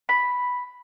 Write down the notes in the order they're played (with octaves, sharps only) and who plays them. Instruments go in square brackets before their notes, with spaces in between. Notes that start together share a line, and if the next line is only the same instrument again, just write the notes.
[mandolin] B5